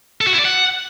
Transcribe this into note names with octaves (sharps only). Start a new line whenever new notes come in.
A4
F#4
E4
D5
F#5